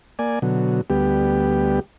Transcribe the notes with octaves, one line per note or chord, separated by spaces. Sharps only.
A#3 D5 G#5
B2 D3 F#3
D2 G3 B3 G4